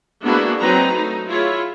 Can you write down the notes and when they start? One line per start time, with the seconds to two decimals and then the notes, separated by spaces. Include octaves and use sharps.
0.23 G#3 A#3 B3 D4 E4 F#4
0.60 F#3 C4 D#4 B4 A#5
0.91 A3 D#4
1.27 E4 F4 G#4 C#5